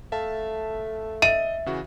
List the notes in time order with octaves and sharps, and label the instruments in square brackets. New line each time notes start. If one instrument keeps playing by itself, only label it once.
[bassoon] A3 [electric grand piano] E5 F5 A5
[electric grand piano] D#5 [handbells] E5 [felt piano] D#7
[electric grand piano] C#3 E3 F#4